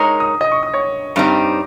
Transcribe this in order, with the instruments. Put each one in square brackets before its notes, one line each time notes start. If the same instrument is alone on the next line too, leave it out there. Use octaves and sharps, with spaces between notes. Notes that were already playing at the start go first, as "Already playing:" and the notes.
Already playing: [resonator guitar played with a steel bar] G#3 D#4 A#4 C#5 [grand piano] D#5 D#6
[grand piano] D#6
D#5 D#6
C#6
D#6
C#5 C#6
[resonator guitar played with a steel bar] G2 G3 C4 D#4